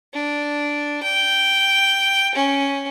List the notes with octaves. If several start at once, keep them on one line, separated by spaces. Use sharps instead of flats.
D4
G5
C#4